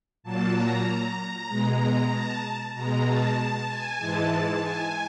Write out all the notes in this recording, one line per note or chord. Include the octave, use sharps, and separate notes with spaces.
A#2 F#3 A#3 A5
A#5
B2 G#3
A5
B2 G#3 A#5
A5
A5
G#5
G#2 E3 G#3 A5
A5
G#5